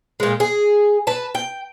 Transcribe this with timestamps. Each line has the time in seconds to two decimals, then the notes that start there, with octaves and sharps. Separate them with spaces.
0.20 A#2 G#3
0.40 G#4
1.07 B4 A5
1.35 G5